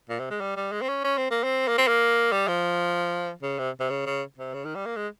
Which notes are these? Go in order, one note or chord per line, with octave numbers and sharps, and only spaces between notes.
A#2
C3
G#3
G3
G3
G#3
C4
C#4
C#4
C4
A#3
C4
A#3
C4
A#3
G3
F3
C#3
C3
C3
C#3
C#3
C3
C#3
D#3
G3
A#3
G#3